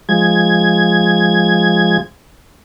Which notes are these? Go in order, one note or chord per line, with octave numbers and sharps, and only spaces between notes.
F3 G#3 G#6